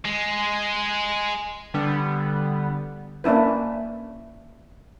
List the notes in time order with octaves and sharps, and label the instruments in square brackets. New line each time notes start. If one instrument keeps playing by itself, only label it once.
[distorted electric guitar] G#3
[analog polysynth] D3 G3 B3
[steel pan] A#3 C#4 D4 E4 B4